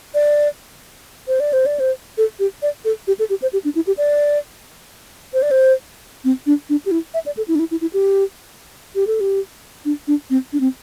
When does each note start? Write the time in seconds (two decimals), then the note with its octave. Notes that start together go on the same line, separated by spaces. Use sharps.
0.14 D5
1.28 C5
1.40 D5
1.53 C5
1.66 D5
1.80 C5
2.18 A4
2.39 G4
2.62 D5
2.85 A4
3.07 G4
3.19 A4
3.30 G4
3.42 C5
3.53 G4
3.64 D4
3.75 E4
3.87 G4
3.97 D5
5.34 C5
5.42 D5
5.51 C5
6.24 C4
6.46 D4
6.69 D4
6.86 G4
6.91 E4
7.14 E5
7.26 D5
7.37 A4
7.48 E4
7.55 D4
7.59 E4
7.71 E4
7.81 E4
7.93 G4
8.95 G4
9.07 A4
9.20 G4
9.85 D4
10.08 D4
10.30 C4
10.53 D4
10.60 C4